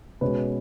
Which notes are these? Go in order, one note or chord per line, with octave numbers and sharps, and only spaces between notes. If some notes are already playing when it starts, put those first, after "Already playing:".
B2 G#3 C#4 B4